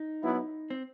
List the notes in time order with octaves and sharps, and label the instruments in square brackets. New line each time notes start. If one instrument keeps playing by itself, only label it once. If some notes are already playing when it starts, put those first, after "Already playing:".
Already playing: [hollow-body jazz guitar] D#4
[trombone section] F#3 B3 E4
[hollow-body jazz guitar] C4